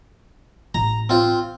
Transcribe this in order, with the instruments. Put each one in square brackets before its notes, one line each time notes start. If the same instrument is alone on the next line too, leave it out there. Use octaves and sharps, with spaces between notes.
[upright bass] A1 [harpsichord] A#5
[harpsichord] C4 F4